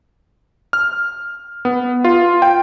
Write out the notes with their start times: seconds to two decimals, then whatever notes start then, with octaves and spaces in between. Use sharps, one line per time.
0.73 F6
1.65 B3
2.04 F4
2.42 G5